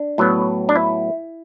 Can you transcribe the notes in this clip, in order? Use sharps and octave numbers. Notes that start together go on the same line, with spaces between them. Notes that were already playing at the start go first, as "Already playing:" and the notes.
Already playing: D4
A2 F#3 B3
D4
E4